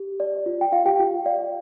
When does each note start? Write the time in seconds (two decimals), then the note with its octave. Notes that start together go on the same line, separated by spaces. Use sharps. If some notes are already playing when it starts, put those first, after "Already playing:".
Already playing: G4
0.20 D5
0.46 F4
0.61 G5
0.72 F4 F5
0.86 G4 G5
0.99 F4
1.26 D5 F5